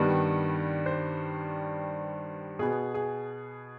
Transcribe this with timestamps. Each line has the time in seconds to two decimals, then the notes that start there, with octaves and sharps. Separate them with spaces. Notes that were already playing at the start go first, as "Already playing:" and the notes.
Already playing: G2 D#3 G3 B3
0.86 C5
2.59 B2 B3 G#4
2.94 G#4